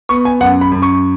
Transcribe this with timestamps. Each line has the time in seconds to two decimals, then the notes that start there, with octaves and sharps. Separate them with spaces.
0.09 B3 C#6
0.25 G#5
0.40 F#2 F#5
0.61 B5
0.72 F#2
0.82 C#6